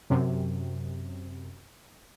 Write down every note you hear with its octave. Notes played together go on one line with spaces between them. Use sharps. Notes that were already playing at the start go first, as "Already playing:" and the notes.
F#2 C3